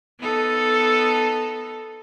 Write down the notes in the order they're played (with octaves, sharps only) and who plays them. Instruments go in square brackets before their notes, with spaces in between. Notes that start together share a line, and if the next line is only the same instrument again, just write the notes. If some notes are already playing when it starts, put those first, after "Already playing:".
[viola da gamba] B3 D#4 A4